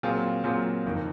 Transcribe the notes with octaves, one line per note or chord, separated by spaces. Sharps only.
A#2 F#3 C4 F4 G#4
A#2 F#3 C4 F4 G#4
F#1 F2 D#3